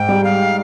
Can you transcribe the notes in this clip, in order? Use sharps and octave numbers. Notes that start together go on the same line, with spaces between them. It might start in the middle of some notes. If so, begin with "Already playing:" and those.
Already playing: G#2 G5
G3
F5